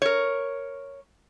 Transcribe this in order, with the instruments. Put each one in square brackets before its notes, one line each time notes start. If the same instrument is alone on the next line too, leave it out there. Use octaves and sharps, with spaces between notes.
[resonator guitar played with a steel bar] A#4 C#5